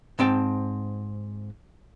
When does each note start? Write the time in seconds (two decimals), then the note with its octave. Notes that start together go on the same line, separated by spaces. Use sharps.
0.19 G#2 C4 G5 A5